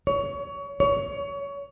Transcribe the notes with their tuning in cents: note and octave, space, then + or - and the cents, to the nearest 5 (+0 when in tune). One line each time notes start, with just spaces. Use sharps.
C#5 +25
C#5 +25